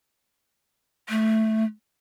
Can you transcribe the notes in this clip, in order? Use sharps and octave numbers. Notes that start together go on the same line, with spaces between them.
A3